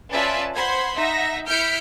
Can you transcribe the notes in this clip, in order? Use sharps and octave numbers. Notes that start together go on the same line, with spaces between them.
C#4 F4 B4 D5 E5 A5
C5 F#5 B5 C6 G#6
D#4 E5 F#5 A#6
E4 F6 G6 B6 C#7 D7